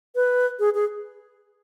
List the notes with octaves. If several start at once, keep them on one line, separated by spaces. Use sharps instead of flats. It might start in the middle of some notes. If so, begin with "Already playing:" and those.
B4
G#4
G#4